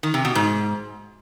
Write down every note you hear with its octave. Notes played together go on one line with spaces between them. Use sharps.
D#3
C3
B2
G#2